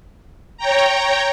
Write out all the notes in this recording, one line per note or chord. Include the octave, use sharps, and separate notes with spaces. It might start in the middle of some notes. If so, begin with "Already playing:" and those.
C#5 G5 A#5